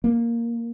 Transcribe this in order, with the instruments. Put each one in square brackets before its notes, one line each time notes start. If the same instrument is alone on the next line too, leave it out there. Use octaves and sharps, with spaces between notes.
[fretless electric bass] A#3